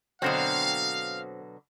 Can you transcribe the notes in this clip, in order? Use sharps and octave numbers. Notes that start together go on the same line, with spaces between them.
B2 D3 F#3 C4 C5 F5